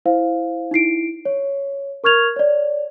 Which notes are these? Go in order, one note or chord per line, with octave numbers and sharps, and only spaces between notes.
E4 C5 F5
D#4 E4 C7 D7
C#5
A#4 C#6 F6 G#6 F7
C#5 D5